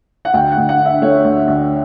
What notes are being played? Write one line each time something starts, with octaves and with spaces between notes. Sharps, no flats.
F#5
D2 G5
F#5
D2
F#5
D3
E5
A3 C#5
D2
D2